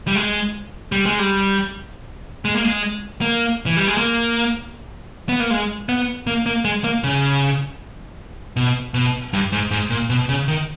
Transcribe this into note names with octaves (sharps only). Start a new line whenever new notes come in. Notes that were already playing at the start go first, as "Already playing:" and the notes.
G3
G#3
G3
G#3
G3
G#3
A#3
G#3
A#3
E3
G3
G#3
A#3
B3
A#3
G#3
B3
A#3
A#3
G#3
A#3
C#3
B2
B2
G2
G#2
G#2
A#2
B2
C#3
D#3